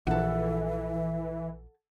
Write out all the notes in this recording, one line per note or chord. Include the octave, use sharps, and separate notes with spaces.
A#1 E3 A4 E5 F#5